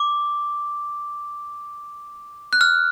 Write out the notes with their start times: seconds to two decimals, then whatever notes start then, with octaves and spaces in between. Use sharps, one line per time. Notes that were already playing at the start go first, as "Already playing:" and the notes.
Already playing: D6
2.53 F#6
2.61 F6